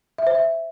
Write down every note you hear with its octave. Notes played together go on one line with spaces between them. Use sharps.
E5
C5
E5